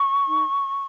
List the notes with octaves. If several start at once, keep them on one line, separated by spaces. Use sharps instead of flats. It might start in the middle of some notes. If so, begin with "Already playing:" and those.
Already playing: C#6
D#4